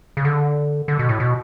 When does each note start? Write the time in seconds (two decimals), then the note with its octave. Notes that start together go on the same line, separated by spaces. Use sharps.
0.17 C#3
0.25 D3
0.88 D3
0.99 B2
1.09 A2
1.20 B2